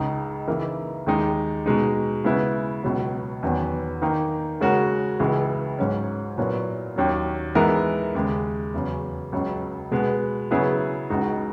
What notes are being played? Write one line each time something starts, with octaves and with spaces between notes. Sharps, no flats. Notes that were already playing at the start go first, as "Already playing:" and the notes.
Already playing: C#2 C#3 G#3 D#4
C#3 E3 A#3 D#4 A#4
D#2 D#3 G#3 D#4
B2 G#3 D#4
C#3 G#3 B3 E4
C#2 B2 F#3
E2 D#3 F#3 B3
D#3 A#3 D#4 A#4
C#3 G#3 C#4 F#4 A#4
C#2 C#3 E3 G#3
G#2 F#3 C#4
A#2 F#3 B3 E4 A#4
D#2 D#3 F#3 C#4
E3 G#3 B3 D#4 A#4
D#2 C#3 G#3
E2 C#3 F#3
C#2 C#3 F#3
B2 G#3 B3
C#3 F#3 B3 E4 G#4
C#2 C#3 G#3 D#4 F#4